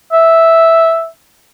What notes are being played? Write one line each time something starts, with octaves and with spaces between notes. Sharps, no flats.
E5